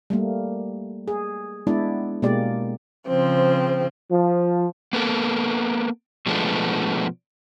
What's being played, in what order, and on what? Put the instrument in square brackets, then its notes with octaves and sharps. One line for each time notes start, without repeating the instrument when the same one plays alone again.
[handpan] G3 A3 A#3
G#4
G#3 B3 D4 E4 D5
B2 G#3 A#3 G4 D5
[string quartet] C#3 F3 C4
[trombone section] F3
[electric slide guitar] A#3 B3 A4 A#4
B2 F3 G#3 A3 B3 D4